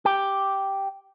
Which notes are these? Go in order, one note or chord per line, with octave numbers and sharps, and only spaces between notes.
G4